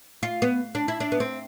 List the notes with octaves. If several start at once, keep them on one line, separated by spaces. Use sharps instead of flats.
F4
B3
D4
E4
D4
B3
C4